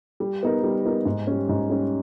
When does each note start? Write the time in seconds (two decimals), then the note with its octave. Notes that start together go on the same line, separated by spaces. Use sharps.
0.20 G3
0.43 B3 D#4 A#4
0.63 G3
0.85 B3 D#4 A#4
1.05 G#2
1.27 G3 C#4
1.49 G#2
1.69 G3 C#4